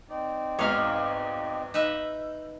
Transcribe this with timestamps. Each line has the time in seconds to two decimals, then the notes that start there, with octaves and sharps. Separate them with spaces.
0.09 C4 D#4 D5
0.59 G#1 E2 G#2 C#5 F5
1.74 D#4 B4 E5 G6